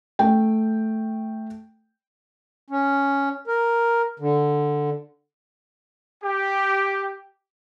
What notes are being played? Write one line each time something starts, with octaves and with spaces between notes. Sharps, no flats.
A3 G5
C#4
A#4
D3
G4